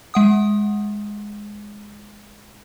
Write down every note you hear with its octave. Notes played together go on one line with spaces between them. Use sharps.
G#3 F#5 D#6